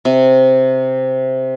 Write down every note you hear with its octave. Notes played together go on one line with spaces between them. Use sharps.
C3